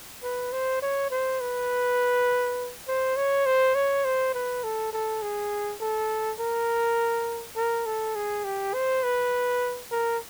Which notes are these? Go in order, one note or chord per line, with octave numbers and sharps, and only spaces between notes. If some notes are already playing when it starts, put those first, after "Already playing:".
B4
C5
C#5
C5
B4
C5
C#5
C5
C#5
C5
B4
A4
A4
G#4
A4
A#4
A#4
A4
G#4
G4
C5
B4
A#4